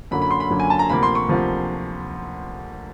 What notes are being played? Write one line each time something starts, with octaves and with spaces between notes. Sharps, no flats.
F#2 D3 F#3 A#3 B5
B5
C6
B5
F#2 D3 F#3 A#3
G#5
A5
A#5
D2 C3 F3 A#3 B5
C6
C#6
D2 C3 F3 A#3